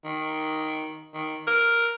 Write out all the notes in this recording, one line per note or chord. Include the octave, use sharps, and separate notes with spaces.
D#3
D#3
A#4